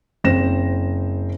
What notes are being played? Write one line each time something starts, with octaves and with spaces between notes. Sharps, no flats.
F#1 C4 A#6 E7